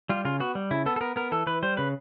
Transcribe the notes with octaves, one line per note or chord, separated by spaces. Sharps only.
G3 F4
C#3 F4
B3 F#4
G3
C#3 E4
B3 A4
A4
B3 A#4
B3 A#4
E3 A4
E3 B4
G3 C5
C#3 B4